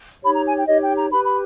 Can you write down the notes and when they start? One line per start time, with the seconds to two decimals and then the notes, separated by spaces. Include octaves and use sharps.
0.23 D#4 G4 C#5 B5
0.34 A#5
0.45 G#5
0.56 G5
0.66 D#4 G4 C#5 D#5
0.81 G5
0.96 A#5
1.10 G4 B4 B5
1.25 B5